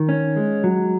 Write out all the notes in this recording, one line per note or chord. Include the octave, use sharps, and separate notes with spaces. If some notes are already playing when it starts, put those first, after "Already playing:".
Already playing: D#3
C#4
G#3
F#3